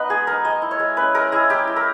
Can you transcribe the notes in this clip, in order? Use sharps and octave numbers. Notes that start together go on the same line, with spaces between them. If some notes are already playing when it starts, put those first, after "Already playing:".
Already playing: B3 D#4 B4 D#5
G#3 G#4
D#4 A#4
G#3 D#5
E4
C#5
G#3
C#4 B4
G#3 A#4
E4 G#4
G#3 G4
E4
A#4